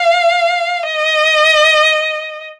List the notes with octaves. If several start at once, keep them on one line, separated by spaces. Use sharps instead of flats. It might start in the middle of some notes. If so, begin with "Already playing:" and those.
Already playing: F5
D#5